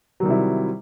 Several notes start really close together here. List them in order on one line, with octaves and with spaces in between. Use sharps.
F#3 D#3 G3 C3 E4